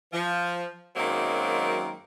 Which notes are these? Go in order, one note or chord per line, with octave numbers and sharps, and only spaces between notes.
F3
F#2 D#3 F#3 G#3 A#3 C4